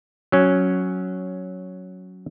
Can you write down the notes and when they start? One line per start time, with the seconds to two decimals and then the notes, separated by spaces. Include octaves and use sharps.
0.32 F#3 C#4